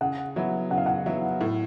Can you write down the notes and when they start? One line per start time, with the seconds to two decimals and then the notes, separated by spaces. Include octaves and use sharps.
0.01 C#3 F#5
0.36 F#3 B3 E4
0.70 C#3 F#5
0.78 F5
0.86 F#5
1.06 F#3 B3 E4
1.41 A2